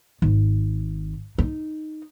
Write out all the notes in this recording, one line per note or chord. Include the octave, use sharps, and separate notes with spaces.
G#1
D#4